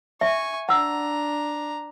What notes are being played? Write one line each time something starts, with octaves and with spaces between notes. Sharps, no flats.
E5 G#5 C#6
D4 F#5 A#5 E6